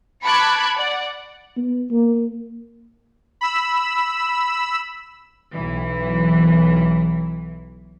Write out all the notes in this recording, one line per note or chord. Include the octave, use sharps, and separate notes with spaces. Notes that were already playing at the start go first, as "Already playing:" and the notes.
A5 B5 C#6 D6 F#6 G#6
D5 F#5
B3
A#3
B5 E6
B1 E3